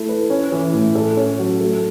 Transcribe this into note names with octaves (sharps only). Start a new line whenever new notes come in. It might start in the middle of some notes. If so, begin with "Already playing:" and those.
Already playing: A3 E4
B4
C#4
E3
A2
A4
C#4
F#3
A3